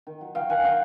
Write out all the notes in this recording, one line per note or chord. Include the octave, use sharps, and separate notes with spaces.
D#3
F#3
F#3 F5 G5
D#3 F#5 G#5
D#3 F5 G5